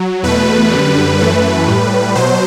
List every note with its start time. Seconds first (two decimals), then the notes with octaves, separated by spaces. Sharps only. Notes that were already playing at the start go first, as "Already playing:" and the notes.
Already playing: F#3
0.23 E2 B2 A3 B4
0.71 F#2 D3 G3
1.19 F#2 E3 A3 B4
1.68 A2 G3
2.15 B2 F#3 C5